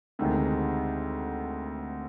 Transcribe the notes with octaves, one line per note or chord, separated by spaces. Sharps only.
D2 C3 D#3 G#3